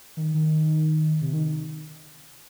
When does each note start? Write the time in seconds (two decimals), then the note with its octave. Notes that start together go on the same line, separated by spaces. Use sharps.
0.17 D#3
0.34 D#3
1.21 C3
1.33 D#3